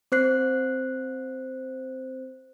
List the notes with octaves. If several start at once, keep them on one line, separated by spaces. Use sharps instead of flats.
C4 C5 F#6 C7